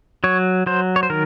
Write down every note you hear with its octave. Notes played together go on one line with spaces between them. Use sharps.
F#3 C#5
F#3 C5
C#5
C5
D#3 A#4